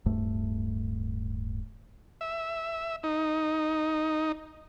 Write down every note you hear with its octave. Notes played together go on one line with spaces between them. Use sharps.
D1 G2 A3
E5
D#4